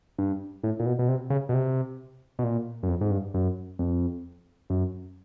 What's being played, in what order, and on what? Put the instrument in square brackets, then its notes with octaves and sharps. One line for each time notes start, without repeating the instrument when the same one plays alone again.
[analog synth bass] G2
A2
A#2
B2
B2
C3
C#3
B2
C3
B2
A#2
F#2
F2
G#2
G2
F#2
F2
F#2